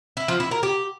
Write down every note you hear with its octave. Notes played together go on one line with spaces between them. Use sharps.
E4
F3
E4
A#4
G4